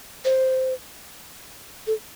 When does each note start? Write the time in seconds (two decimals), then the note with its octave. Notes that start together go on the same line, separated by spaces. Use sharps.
0.25 C5
1.87 A4